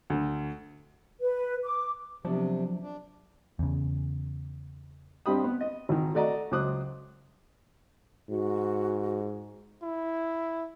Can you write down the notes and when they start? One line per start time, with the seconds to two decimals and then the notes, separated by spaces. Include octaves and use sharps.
0.10 D2
1.20 B4
1.64 D6
2.25 C3 F3 F#3 B3 D4
2.82 D4
3.59 E2 C#3
5.26 G2 C4 D4 G4 B5 D#6
5.44 B3
5.61 D#5
5.89 G#1 D#3
6.15 A3 F#4 D5 D#5 A#5
6.51 C#2 F#3 C5 D6 D#6 F#6
8.30 G#2 F#4
9.83 E4